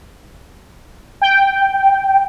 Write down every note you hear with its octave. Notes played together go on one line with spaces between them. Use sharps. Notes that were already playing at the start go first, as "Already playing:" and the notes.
G5